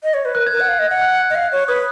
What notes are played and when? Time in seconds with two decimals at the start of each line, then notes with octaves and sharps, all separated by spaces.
0.03 D#5
0.14 C#5
0.25 B4
0.35 A#4 F#6
0.46 G#6
0.52 A#4
0.57 F#5 F#6
0.68 F5
0.79 D#5
0.90 F#5
1.02 F#6
1.30 D#5
1.35 F5 F#6
1.52 C#5
1.68 B4 D#6